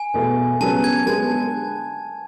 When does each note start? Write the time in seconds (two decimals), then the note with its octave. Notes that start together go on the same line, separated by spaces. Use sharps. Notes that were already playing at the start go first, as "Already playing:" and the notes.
Already playing: G#5
0.14 E2 B2 A3
0.60 C#3 F#3 B3 A5
0.84 G#6
1.06 D3 G#3 B3 A5